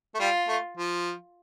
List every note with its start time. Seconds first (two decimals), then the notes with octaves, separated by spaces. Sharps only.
0.14 A3
0.19 G3 F4
0.48 A3
0.78 F3